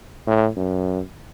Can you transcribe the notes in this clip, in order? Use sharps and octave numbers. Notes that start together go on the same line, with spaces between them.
A2
F#2